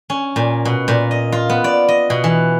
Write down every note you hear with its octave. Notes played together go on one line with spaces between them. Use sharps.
C#4
A#2
B2
A#2
D#5
F4
B3
D5
D#5
B2
E3